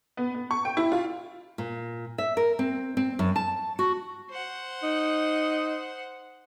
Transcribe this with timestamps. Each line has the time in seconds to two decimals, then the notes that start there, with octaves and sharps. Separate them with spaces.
0.17 B3
0.34 B3
0.51 C#6
0.65 G5
0.77 E4
0.92 F4
1.58 A#2
2.18 E5
2.37 A#4
2.59 C4
2.97 C4
3.19 F#2
3.36 A5
3.79 F#4
4.30 C5 F#5
4.83 D#4